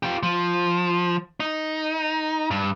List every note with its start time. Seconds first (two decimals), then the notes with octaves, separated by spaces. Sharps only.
0.03 F4 G4
0.23 F3
1.40 D#4
2.51 G2